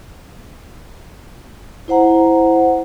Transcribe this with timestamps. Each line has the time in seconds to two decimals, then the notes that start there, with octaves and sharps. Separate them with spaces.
1.88 E4 C5 F#5 A#5